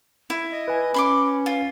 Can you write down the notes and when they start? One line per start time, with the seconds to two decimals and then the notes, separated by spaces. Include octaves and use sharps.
0.30 E4
0.52 D#5
0.68 B4 G#5
0.94 C#4 B5 C6 D6
1.46 F4